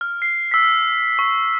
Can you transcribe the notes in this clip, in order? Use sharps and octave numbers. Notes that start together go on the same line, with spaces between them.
F6
C7
E6 B6
C#6